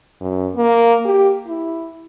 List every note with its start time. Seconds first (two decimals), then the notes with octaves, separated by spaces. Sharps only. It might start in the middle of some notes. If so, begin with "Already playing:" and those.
0.21 F#2
0.56 A#3
1.05 G4
1.47 E4